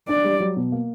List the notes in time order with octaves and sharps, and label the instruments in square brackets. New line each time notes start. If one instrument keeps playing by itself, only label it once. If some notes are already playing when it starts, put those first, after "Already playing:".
[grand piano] D4 [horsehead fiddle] D5
[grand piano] G3
F#3
B2
A#3